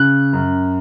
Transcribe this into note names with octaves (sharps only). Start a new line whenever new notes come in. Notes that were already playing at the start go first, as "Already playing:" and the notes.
Already playing: C#3 F#6
F#2